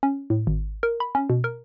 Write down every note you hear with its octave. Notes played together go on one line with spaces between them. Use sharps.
C#4
A2
G#1
A#4
B5
C#4
B2
A#4